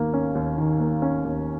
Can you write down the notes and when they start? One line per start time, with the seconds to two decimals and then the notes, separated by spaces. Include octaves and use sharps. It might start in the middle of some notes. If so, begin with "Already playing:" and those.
Already playing: D#2 D#3 A#3
0.14 C#4
0.35 D#2
0.58 D#3
0.80 A#3
1.02 C#4
1.25 D#2